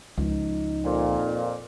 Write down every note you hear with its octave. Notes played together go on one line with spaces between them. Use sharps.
C#2 F3 D#4
F2 A#2